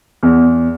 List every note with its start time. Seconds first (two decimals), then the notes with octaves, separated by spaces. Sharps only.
0.23 E2